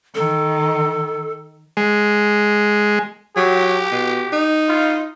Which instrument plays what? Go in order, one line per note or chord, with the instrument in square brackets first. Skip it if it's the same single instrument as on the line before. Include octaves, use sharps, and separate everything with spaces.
[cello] D#3 [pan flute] A4
[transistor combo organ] G#3
[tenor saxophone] F#3 [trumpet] G4
[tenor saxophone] B2
D#4
[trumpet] F4